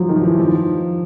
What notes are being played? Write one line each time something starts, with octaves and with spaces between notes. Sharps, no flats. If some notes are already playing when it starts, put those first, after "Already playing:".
Already playing: F3 F#3
D#3
F3
E3
F3